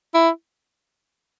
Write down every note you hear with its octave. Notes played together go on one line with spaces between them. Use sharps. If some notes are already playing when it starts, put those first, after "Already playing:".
E4